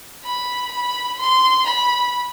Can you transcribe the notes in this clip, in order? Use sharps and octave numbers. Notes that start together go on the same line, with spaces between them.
B5
B5
C6
B5